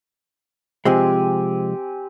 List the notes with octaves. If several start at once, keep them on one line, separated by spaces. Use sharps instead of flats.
C3 F3 G#3 C4 G4 G#5